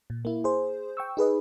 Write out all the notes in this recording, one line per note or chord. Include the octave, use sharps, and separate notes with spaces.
A#2
A#3 E4
G#4 C5
G5 C#6 E6
D#4 G#4 B4 D#5